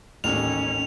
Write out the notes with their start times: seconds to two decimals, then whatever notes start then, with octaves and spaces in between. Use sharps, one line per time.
0.24 A1 D#2 G#2 C#4 F7